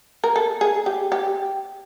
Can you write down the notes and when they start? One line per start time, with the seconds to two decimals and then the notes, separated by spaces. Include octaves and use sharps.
0.24 A#4
0.36 A4
0.61 G#4
0.86 G4
1.12 G4